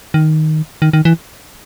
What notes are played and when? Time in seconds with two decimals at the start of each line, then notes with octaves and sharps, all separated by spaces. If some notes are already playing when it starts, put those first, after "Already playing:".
0.14 D#3
0.82 D#3
0.93 D#3
1.05 E3